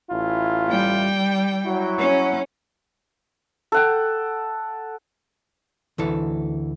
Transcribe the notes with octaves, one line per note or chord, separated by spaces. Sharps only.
A1 E4 F4
G3 G5
F#3 E4 F#4
C#4
A4 F#5 G5
D2 E3 A4